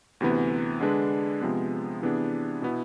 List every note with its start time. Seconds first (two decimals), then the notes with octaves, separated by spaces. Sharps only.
0.20 D2 C3 E3 B3
0.81 D3 G#3 D4 G#4 B4
1.42 C3 F3 G#3 B3
2.02 C3 E3 B3 D4 G#4
2.62 B2 B3 E4